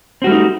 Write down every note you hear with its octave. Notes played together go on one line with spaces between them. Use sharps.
G3 A3 C4 D#4 F#4